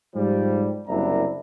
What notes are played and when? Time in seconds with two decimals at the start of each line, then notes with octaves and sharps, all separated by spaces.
0.15 G#2 F3 G3
0.88 F#1 C2 D4 E4 A#5